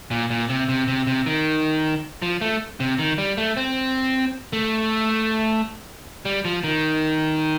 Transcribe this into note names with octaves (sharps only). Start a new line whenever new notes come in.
A#2
A#2
C3
C3
C3
C3
D#3
F3
A3
C3
D#3
G3
A3
C4
A3
G3
F3
D#3